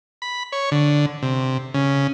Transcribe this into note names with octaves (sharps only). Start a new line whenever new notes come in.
B5
C#5
D3
C3
C#3